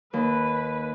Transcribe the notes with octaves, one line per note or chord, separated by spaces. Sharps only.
D#2 B4